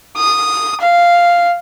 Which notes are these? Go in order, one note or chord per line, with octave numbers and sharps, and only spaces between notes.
D#6
F5